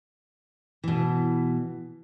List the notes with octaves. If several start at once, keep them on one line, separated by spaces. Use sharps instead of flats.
B2 E3